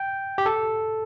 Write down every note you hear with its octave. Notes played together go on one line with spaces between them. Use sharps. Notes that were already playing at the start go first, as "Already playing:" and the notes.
Already playing: G5
G4
A4